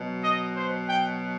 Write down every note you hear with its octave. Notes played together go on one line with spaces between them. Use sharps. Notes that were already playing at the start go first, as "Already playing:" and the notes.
Already playing: B2 F#3
D#5
C5
G5